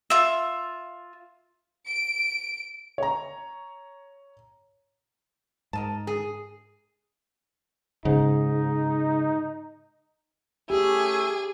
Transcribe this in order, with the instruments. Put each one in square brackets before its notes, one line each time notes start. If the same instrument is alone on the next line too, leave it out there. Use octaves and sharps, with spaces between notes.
[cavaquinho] F4 E5
[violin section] D7
[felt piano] C#5 A#5
[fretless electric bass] G#2 [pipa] A#4 D#5 A5
[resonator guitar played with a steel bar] G#4
[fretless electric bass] G#2 [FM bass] C#3 [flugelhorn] D#4
[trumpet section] A3 C#4 E4 [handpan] G4 [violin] G#4